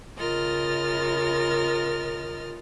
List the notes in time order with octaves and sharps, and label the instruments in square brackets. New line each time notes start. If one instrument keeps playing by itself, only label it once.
[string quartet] C#3 F4 A#4 D#5 F6 A6